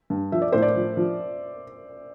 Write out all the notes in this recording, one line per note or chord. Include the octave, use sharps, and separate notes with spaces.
G2
F3 E5
D5
A2 C5
D5
F3
F3